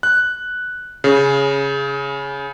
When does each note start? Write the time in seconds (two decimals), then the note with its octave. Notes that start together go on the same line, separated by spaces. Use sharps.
0.03 F#6
1.04 C#3